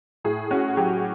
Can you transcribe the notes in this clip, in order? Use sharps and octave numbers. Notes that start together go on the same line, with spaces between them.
A2 G#4
C#4 F#4
F#3 G4